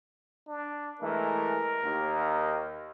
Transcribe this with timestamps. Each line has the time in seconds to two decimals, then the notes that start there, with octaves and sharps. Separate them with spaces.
0.48 D4
1.01 E3 G#3 A3 A#4
1.83 D#2